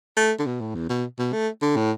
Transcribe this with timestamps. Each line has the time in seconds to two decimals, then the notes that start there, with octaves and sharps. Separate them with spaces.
0.17 A3
0.39 D3
0.46 B2
0.61 A2
0.75 E2
0.89 B2
1.19 B2
1.33 A3
1.62 D3
1.76 A2